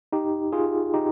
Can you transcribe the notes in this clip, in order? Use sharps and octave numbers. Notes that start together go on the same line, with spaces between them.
D#4 G4
F4 G#4
D#4 G4